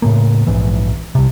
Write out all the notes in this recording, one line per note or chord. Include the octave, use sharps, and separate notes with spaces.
A2 C#3 A#3
A#1 G#2 E3
C2 C3